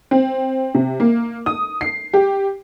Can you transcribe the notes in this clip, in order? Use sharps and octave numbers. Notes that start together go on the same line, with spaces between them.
C4
C3
A#3
D#6
C7
G4